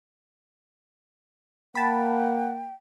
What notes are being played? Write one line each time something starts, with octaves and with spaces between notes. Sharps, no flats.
A#3 F#5 G5 A5 B5